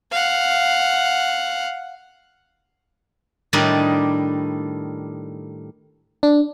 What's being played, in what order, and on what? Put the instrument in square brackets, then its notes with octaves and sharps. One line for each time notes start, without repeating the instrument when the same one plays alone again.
[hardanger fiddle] F5 F#5
[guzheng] A2 D#3 G3 D4 D#4
[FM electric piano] D4